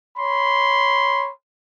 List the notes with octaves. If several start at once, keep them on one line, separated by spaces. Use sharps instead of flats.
C#5 B5 C6